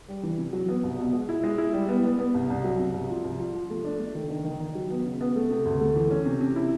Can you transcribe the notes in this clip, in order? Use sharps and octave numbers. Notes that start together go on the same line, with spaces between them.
G3
E3
C3
F#3
B3
C2
B2
G#3
E4
G#3
E4
G3
B3
B3
B3
C2
C2
F#3
C3
C2
F3
C2
F3
F3
A3
D4
A3
D#3
D#3
D#3
D#3
F#3
B3
C#3
B3
A3
C3
D2
A3
E3
C#4
C3
C3
E4